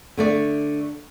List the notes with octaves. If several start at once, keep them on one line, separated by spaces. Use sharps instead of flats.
D3 A3 D5